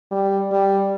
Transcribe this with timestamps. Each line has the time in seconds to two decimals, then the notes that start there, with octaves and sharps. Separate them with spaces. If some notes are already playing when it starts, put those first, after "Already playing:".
0.11 G3
0.52 G3